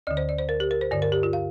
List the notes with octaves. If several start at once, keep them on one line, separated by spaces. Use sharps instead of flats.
D2 D3 D5
C5
D5
C5
A#4
G4
A#4
C5
G2 D3 D5
A#4
G4
F4
F5